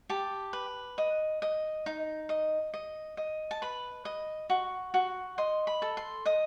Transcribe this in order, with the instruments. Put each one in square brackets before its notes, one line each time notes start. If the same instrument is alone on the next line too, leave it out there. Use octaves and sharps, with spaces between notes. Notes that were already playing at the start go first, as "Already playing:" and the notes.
[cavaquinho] G4 A5
B4
D#5
D#5
D#4
D#5
D#5
D#5
A5
B4 B5
D#5
F#4
F#4
D#5 C6
B5
A4
C6
D#5 D#6